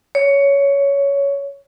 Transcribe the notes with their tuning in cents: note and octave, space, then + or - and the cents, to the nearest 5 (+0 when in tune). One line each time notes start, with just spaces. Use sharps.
C#5 +15